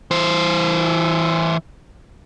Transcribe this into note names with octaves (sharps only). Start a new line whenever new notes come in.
E3 C5